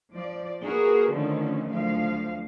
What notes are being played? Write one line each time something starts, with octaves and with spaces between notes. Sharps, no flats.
F3 D5
A#3 F#4 G#4 A#4 B4
D3 D#3 F3 A3 C#4
D2 F3 F#3 F5